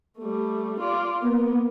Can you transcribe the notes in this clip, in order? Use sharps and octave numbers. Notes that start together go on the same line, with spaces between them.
G3 A3
F4 D5
A#3 B3